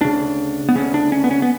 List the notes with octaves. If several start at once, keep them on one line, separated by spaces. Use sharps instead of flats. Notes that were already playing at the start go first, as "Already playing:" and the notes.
D2 C#3 D4
B3
D2 C#3 C#4
D4
C#4
B3
C#4
B3